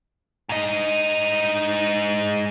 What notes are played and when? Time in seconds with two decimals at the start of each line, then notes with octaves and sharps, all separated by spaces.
0.49 G#2 D#5